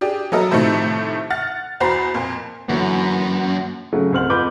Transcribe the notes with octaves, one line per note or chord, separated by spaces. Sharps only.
D4 G4 G#4
F#3 B3 F#4 A4 A#4 D#5
A2 C3 D#3 F3 A3
F#5 F6 A6
E2 F#4 C5 A#5 B5 C7
F2 A#2
F#2 D3 E3 F#3 A#3 B3
C#3 F#3 A3
C2 C5 F6 F#7
F2 F4 B4 D6 G6